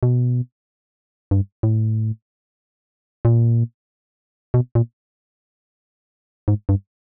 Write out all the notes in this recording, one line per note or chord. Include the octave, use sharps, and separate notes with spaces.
B2
G2
A2
A#2
B2
A#2
G#2
G2